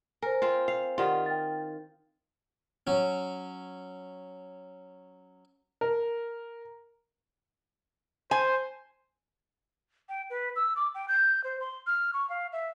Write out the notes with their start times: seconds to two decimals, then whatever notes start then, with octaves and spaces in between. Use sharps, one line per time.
0.22 A#4 C5 G#5
0.42 C4 F4
0.68 F5
0.98 D#3 F4 G4 D5 F#5
1.26 G5 A6
2.87 F#3 C#4
5.81 A#4
8.31 C5 G#5
10.09 G5
10.30 B4
10.56 E6
10.76 D6
10.95 G5
11.08 G6
11.44 C5
11.60 C6
11.87 F6
12.14 C#6
12.30 F5
12.53 E5